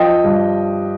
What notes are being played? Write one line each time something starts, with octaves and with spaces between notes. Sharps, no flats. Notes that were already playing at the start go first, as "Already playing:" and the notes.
Already playing: F3 D#5 G5
G2